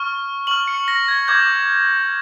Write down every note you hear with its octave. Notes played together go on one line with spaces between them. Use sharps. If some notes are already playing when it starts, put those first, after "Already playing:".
Already playing: C#6 F6
C#6 F6 F#7
C#7
A#6
G#6
D6 G6 G#6